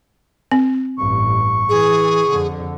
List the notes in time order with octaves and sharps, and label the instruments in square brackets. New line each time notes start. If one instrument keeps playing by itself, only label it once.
[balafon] C4
[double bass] A1 G2 [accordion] C#6
[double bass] E3 [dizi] G#4
[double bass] F2 D3